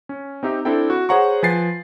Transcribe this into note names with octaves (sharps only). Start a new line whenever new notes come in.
C#4
C4 D#4 G4 E5
C4 D4 E4 A4 G5
F#4
G#4 C5 C#5 F#5 A#5 C#6
F3 B4 G#5 A6 C7